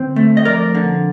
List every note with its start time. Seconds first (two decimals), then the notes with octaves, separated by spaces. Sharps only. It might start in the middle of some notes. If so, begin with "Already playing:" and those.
Already playing: D3 C4 C5
0.16 A3
0.37 D#5
0.45 F2 A#4 D5
0.75 D3